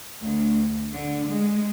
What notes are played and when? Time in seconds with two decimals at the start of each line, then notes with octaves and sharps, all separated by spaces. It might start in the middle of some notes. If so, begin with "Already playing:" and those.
0.23 D2
0.94 D3
1.28 G#3